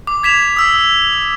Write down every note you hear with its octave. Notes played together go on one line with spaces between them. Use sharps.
D6
G#6 B6 E7 F7
D#6 E6 B6